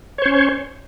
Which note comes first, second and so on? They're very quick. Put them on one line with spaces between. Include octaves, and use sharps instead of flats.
C#5 C5 C#4